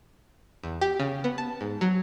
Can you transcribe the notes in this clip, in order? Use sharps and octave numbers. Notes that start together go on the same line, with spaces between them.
E2
G4
C#3
B3
A5
G#2
F#3